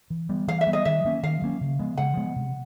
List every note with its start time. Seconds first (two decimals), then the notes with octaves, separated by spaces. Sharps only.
0.10 E3
0.29 G3 B3
0.47 E3 F5
0.61 E5
0.67 G3 B3
0.73 D#5
0.85 D#3 E5
1.04 F#3 A#3 C#4
1.23 D#3 F5
1.42 F#3 A#3 C#4
1.61 C#3
1.79 F3 G#3 B3
1.98 C#3 F#5
2.17 F3 G#3 B3
2.36 C3